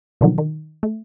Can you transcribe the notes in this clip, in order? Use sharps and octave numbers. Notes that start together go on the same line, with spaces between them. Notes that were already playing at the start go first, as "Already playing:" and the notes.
B2 D3 D#3 F3 F#3
D#3
A3